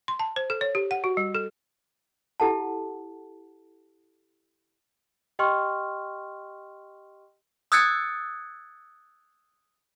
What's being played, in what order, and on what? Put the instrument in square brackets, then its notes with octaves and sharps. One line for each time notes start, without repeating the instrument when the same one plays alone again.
[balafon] C6
A5
C5
A4
C#5
G4
F#5
F#4
G3
A4
[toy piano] E4 G4 A4 F#5 A5
[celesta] G4 D#5 G5 C6 C#6 F6
[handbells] D#6 E6 F#6 G#6 A6 C#7